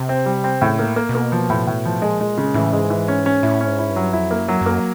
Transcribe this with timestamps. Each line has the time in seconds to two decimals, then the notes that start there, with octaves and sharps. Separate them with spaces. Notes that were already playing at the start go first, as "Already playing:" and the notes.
Already playing: C3
0.09 C4
0.26 G3
0.44 C4
0.61 A2 C#3
0.79 A#3
0.96 A#3
1.09 B2
1.15 A#3
1.32 F3
1.50 A2
1.67 A2
1.85 F3
2.02 A#2 G#3
2.21 G#3
2.38 A2 C#3
2.46 A#2
2.54 A2 E3
2.73 G#2 G#3
2.90 E3
3.08 C#4
3.26 C#4
3.43 A2 E4
3.61 C#4
3.67 G#2
3.79 E4
3.90 G2
3.96 F#3
4.13 F2 E4
4.31 A#3
4.36 F#2
4.48 F#3
4.61 F#2
4.66 A#3